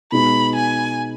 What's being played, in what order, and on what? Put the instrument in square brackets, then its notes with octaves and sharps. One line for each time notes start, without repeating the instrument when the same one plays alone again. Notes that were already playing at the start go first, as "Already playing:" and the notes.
[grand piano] B2 G#3 B3 D#4 [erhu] B5
[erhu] G#5